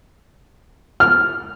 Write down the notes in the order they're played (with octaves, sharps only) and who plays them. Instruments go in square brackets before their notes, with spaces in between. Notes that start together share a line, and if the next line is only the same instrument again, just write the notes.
[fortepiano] F6